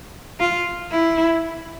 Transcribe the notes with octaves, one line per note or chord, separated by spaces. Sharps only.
F4
E4